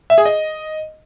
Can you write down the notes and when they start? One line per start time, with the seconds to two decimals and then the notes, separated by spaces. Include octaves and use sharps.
0.10 E5
0.18 G#4
0.26 D#5